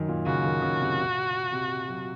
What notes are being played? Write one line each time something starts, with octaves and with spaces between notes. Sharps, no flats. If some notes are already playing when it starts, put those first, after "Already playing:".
Already playing: F#2 D#3
A#2
C#3 F#4
D#3
C#3
C3
A#2
C3
F#3